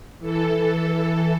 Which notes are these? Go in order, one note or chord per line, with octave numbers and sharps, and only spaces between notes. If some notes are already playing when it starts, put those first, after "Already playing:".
E3 A4